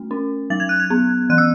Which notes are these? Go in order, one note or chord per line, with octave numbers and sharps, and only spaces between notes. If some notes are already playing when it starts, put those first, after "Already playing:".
Already playing: A3 C#4
C#4
F#3 A6
G#6
F#6
G#6
B3
E3 F#6
E6